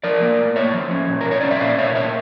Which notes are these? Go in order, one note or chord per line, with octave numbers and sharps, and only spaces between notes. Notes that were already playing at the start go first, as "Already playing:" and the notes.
F3 A#4 D5
A#3
A2
A#3 C#5 E5
F3
C#4
A#2
A#4
A#2
C#5
C#4 D5
E5
A#2 D5 F5
A#2 C#5 E5
A#2 C#5 E5